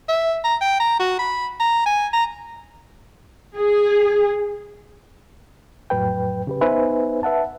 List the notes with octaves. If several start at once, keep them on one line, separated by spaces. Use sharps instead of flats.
E5
A#5
G5
A#5
F#4
B5
A#5
G#5
A#5
G#4
F2 A2 F#3 B4 G5
C#3 G4 B4
B3 D#4 B4 C5 E5 G#5
B4 E5 F#5 A5